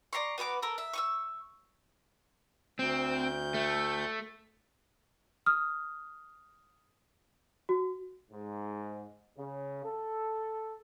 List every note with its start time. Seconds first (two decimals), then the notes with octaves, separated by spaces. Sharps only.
0.13 D5 A#5 C6 C#6
0.38 B3 F#4 B4 D6
0.62 A4 A#4
0.78 E5
0.93 C#6 D#6 E6
2.79 D2 C4 G6
3.54 A3
5.46 D#6 F6
7.69 F#4
8.31 G#2
9.37 C#3
9.83 A4